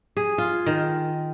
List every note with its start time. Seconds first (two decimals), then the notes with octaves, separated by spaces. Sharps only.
0.17 G#4
0.38 F4
0.66 D#3